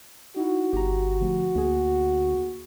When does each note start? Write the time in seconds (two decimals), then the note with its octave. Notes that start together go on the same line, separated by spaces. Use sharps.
0.36 D#4 E4 F#4
0.73 G1 G4 A#5
1.20 D3 F3 A3
1.55 D2 A#3 G#4